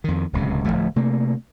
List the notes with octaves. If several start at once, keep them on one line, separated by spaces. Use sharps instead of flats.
F2 D#3
D1 C#2 C3
D1 E2 F3 A3
C3 A3 A#3